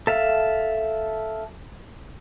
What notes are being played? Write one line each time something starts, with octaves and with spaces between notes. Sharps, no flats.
A4 E5 F5